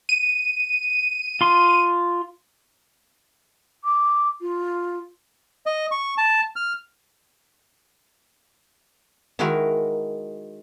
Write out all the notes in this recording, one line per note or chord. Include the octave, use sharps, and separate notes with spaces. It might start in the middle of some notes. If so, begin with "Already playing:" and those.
D#7
F4 C6
D6
F4
D#5
C#6
A5
F6
D#3 G#3 E4 F#4 A#4